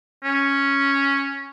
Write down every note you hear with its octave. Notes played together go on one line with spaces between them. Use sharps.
C#4